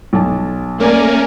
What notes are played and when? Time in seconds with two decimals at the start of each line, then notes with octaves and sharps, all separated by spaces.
0.13 B1 A5
0.80 A3 A#3 C#4 A#4 D5 G#5